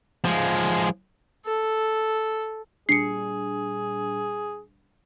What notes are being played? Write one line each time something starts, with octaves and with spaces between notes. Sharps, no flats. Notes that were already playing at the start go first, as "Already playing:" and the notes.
F3 G#3
A4
A#2 G3 D4 G#4 C7 C#7